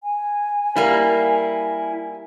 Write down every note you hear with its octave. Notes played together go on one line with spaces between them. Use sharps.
G#5
G3 A#3 E4